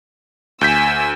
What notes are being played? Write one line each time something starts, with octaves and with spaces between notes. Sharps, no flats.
D2 G#5 E6 G6 B6